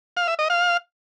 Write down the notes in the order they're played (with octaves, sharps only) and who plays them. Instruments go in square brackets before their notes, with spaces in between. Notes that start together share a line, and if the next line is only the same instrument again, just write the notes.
[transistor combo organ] F5
E5
D#5
F5